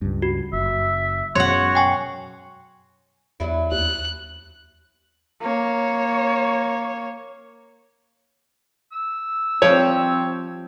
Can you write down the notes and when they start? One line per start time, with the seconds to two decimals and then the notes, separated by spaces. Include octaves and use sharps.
0.02 C#2 G2
0.22 F#4
0.53 F#1 E5
1.35 F#2 B2 F#4 C#5 F#5 C6
1.75 G5 G#5 C#6
3.40 E2 F#3 D4 E4
3.72 D#2 F#6
5.41 A#3 C#5
8.92 E6
9.62 F3 G3 C4 G4 C#5